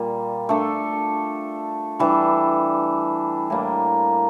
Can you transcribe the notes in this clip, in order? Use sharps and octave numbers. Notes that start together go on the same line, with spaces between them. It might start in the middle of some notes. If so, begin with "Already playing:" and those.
Already playing: A#2 G3 A#3 F4
A3 D4 A4
E3 G3 D4
A2 G3 A#3